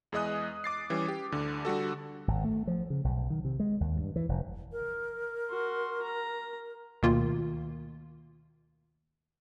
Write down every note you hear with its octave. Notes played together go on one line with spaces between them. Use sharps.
E2 G#3 G#4 D#5 D#6 F#6
D6 A6 C7
E3 G3 C#4
G4
D2 D3
D3 G3 F#4 A4
G#1
A3
F3
C#3
B1
D#3
C3
G#3
D#2
G2
E3
F1
A#4
F#4 C6
A#5
D2 B2 D#3 A#3 F4